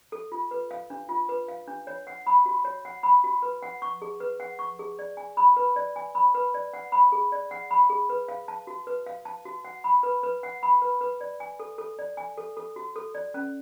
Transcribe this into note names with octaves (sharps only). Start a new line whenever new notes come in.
A4
F4
B4
F5
D4
F4
B4
F5
D4
C#5
F#5
B5
F#4
C#5
F#5
B5
F#4
B4
F#5
C#6
G#4
B4
F#5
C#6
G#4
D5
G#5
B5
B4
D5
G#5
B5
B4
D5
F#5
B5
G#4
D5
F#5
B5
G#4
B4
F5
A5
F#4
B4
F5
A5
F#4
F#5
B5
B4
B4
F#5
B5
B4
B4
D5
G#5
A4
A4
D5
G#5
A4
A4
F#4
A4
D5
C#4